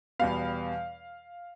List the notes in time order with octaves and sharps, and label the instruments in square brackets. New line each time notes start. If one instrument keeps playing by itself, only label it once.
[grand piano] E2 B2 G3 B3 F5